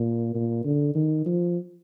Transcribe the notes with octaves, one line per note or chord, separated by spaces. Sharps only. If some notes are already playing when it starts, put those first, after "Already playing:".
Already playing: A#2
A#2
D3
D#3
F3